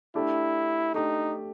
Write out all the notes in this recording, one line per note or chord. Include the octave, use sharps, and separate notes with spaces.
A3 D4 E4 G4
A3 D4 D#4 G4